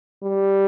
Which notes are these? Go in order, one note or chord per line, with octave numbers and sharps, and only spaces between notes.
G3